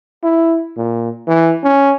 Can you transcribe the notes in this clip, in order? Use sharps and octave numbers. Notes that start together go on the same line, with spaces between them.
E4
A#2
E3
C#4